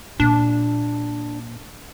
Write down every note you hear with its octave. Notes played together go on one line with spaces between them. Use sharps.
A#2 D4